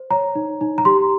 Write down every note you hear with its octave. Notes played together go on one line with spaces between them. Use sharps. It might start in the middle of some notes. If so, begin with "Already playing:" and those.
Already playing: C5
C#5 A#5
D#4
D#4
A#5
G4 C6